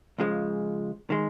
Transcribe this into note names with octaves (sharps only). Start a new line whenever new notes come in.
C#2 C#3 F3 G#3
D#3 G#3